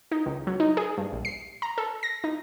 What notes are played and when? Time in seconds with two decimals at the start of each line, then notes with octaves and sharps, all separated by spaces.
0.12 D#4
0.26 C#2
0.47 F#3
0.60 D#4
0.77 G#4
0.98 G2
1.12 A#1
1.25 C7
1.62 A#5
1.78 A4
2.03 A#6
2.24 D#4